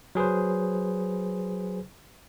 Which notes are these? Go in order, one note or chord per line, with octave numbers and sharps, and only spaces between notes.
F#3 G#4 B4 C5